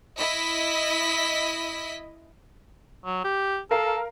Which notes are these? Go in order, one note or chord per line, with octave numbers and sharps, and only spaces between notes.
E4 D#5 B6
F#3
G4
A4 A#4 F5 C7